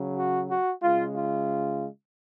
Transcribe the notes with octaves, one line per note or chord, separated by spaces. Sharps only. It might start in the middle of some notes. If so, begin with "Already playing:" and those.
Already playing: C#3 F#3
F#4
F#4
C#3 G#3 F4
F4